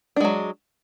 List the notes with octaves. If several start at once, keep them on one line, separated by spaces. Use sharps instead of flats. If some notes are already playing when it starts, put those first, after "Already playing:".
F#3 G#3 D4